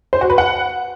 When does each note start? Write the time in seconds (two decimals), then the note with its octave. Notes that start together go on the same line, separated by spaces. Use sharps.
0.13 C5
0.21 F#4
0.30 B4
0.38 F#5